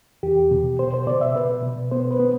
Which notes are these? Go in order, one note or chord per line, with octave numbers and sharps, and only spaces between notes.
E2 G4
B2
B2 C5
C5
B2 D5
E5
B2 B4
B2
B3 C5
B4
B3